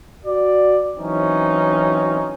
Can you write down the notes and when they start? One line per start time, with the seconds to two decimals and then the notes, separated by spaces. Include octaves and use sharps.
0.24 F#4 D5
0.96 E3 F#3 C4 C#4 D#4